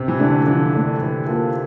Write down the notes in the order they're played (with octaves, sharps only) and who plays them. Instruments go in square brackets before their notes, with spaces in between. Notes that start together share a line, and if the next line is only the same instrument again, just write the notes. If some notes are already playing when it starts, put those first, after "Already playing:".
Already playing: [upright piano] C3
E3
[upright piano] D3 [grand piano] A3 D4 A4
[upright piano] D3 [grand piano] F3
[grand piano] A3 D4 A4
E3
A#3 F4 A4